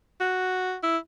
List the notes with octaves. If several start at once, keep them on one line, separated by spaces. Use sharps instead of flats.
F#4
E4